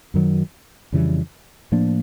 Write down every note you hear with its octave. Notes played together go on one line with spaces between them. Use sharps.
F#2 D#3 F#3
F2 C#3 E3 G3
A2 F3 A#3 D4